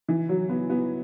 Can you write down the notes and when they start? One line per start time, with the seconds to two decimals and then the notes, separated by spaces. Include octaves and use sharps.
0.08 E3
0.29 F#3
0.49 B3
0.70 B3